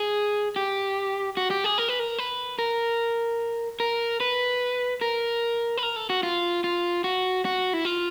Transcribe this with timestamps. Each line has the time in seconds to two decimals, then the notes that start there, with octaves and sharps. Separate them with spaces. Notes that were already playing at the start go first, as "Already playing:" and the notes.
Already playing: G#4
0.56 G4
1.37 F#4
1.51 G4
1.64 G#4
1.78 A#4
1.89 B4
1.99 A#4
2.18 B4
2.59 A#4
3.80 A#4
4.20 B4
5.01 A#4
5.78 B4
5.83 A#4
5.96 A4
6.10 F#4
6.23 F4
6.64 F4
7.04 F#4
7.45 F#4
7.73 E4
7.85 F4